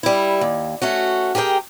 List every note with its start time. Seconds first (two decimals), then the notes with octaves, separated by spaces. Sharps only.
0.03 G3 E4
0.41 D#2
0.82 A3 C#4 F#4
1.35 G4 G#4 A#4 C#5 G5